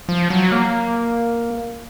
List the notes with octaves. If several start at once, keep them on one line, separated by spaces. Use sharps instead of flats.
F3
F#3
A#3